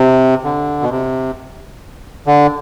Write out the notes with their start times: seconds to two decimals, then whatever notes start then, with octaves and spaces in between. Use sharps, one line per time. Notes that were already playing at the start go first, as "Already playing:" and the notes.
Already playing: C3
0.44 D3
0.82 B2
0.90 C3
2.26 D3